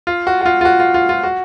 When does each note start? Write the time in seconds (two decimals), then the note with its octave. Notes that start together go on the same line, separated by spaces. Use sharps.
0.07 F4
0.27 F#4
0.41 F#4
0.46 F4
0.61 F4
0.65 F#4
0.80 F4
0.94 F4
1.09 F4
1.23 F#4